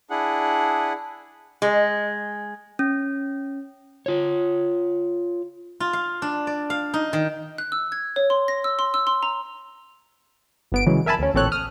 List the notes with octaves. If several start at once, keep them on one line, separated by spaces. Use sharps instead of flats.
D4 E4 G#4 F#5
G#3
C#4
F4 C#5
F4
F5
D4
D5
F5
D#4
D#3
F#6
E6
G#6
C#5
C6
A#6
E6
C6
E6
C6
A#5
G1 B3 D7
C#3 E3 F#3 G#3
A#4 E5 G#5 A5 B5
D2 C#4
A1 A#2 C4 A4 C#5 F#6
D#6 F6